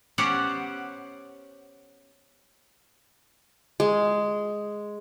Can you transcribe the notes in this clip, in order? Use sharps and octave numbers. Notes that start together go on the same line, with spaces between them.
B3 C#4 G4 C5 D5 F#5
G#3